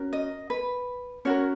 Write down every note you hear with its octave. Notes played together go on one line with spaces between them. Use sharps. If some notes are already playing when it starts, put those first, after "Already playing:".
Already playing: C#4 F#4 A#4
D#5
B4
C#4 F#4 A#4 C#5